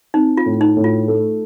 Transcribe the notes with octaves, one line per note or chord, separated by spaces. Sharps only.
C4 D#4
F4
A2
D#4
A2
F4
A3